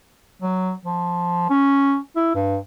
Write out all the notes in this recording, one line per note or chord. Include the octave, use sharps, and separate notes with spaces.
F#3
F3
C#4
E4
G2